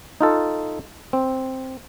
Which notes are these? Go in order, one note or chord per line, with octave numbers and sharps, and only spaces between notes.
D#4 F4 A4
C4